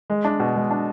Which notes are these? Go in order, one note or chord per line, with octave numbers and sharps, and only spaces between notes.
G#3
D4
B2
G#3
D4